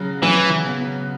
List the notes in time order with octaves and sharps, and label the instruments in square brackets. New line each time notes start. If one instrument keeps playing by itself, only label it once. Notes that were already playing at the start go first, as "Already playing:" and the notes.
Already playing: [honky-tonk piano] C#3 F#3
[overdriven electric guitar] E3 [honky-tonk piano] F#3
[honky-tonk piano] B3